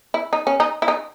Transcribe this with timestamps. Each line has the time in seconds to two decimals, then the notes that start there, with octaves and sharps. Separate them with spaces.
0.14 E4
0.33 D#4
0.47 C#4
0.60 D#4
0.82 E4
0.88 D#4